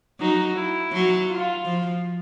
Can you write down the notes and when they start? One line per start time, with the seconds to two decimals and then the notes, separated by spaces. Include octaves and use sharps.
0.20 F#3 D#4
0.55 E4
0.92 F#3
1.28 F4
1.65 F3